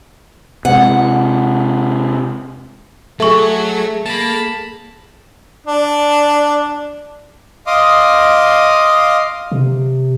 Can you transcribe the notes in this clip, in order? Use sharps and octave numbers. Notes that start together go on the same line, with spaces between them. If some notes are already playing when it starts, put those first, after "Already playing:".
C3 G#3 F#5
F#3 A3 G#4 A4 E5 C#6
A#3 A5 B5
D4
D#5 F5 C6 D6 D#6
C3